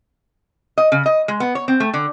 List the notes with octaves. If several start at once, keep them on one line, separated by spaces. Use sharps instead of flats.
D#5
C#3
D#5
G#3
B3
C#5
C4
A3
D3